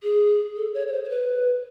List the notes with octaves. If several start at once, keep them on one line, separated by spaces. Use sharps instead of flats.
G#4
A4
C#5
C#5
C5
C5
B4